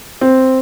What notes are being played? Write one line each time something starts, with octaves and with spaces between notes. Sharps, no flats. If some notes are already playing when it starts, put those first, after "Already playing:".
C4